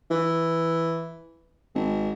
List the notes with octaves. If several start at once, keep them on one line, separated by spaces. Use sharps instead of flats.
E3
G#1